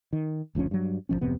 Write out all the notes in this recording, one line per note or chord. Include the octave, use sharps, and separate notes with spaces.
D#3
F#1 D2 F3 C#4
G2 F#3
A#1 F2 F3 C#4
D1 F2 C3 B3